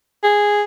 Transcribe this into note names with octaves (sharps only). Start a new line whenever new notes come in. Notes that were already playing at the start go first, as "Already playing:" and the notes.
G#4